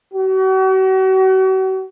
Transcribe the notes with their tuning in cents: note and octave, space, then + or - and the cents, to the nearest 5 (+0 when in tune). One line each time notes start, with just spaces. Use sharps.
F#4 +40